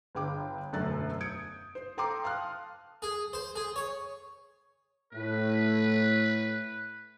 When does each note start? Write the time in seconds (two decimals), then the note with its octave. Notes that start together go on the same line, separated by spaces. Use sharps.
0.15 G1 G#4 G5 D6
0.73 E1 F#2 D3 A3 F#6 A6
1.21 D#6 G6 G#6 C#7 D7
1.75 C5
1.98 A4 G5 A#5 C6 D6
2.24 F5 A5 C6 D#6 F6 F#6
3.02 G#4
3.33 C5
3.56 G#4
3.76 C#5
5.13 A2 B4